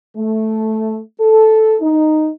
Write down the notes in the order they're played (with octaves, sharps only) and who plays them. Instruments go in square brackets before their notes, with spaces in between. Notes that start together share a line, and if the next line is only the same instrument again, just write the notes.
[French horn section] A3
A4
D#4